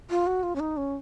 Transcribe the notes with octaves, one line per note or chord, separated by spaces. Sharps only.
F4
F#4
F4
C#4
D#4
C#4